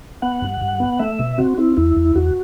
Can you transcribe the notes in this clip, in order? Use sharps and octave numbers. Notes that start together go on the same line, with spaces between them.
B3 F#5
G2
G2
B3
A3 E5
B2
C4 F#4
C4 E4
E2 E4
E2
E2 F#4